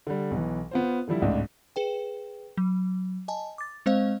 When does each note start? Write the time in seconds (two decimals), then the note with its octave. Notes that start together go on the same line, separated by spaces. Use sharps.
0.07 D3 G3
0.31 B1 E3
0.71 B3 F4 C5
1.08 D3 F3 G3 E4
1.22 G#1 C#2 A2 D4
1.76 G#4 B4 G5
2.57 F#3
3.28 D#5 G#5 A5
3.58 D6 A6
3.86 G#3 C4 C5 D#5 F5